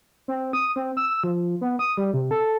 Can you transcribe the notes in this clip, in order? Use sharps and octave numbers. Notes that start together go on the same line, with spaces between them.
C4
D#6
C4
E6
F3
B3
D#6
G3
C3
A4